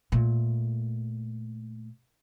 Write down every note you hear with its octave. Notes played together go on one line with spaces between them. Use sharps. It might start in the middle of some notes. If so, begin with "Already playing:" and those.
A#2 A3